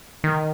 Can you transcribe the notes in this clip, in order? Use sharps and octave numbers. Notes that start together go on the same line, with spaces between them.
D#3